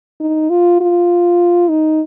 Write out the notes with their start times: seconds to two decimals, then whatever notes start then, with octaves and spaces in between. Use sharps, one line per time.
0.20 D#4
0.50 F4
0.81 F4
1.70 D#4